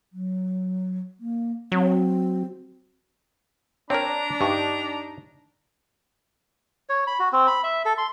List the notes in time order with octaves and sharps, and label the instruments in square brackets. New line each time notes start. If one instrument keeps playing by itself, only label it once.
[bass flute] F#3
A#3
[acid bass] F#3 [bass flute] C4
[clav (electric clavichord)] C4 A#4 [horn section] D4 A#5 [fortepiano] C#5
[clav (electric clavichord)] G2 [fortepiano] D#4 G4 C#6
[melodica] C#5
B5
F#4
C4
B5
E5
A4
C6